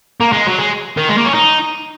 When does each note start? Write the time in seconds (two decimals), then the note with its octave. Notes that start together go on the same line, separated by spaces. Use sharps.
0.21 A#3
0.33 G#3
0.47 F#3
0.59 G#3
0.97 D#3
1.09 G#3
1.18 A#3
1.26 C#4
1.35 D#4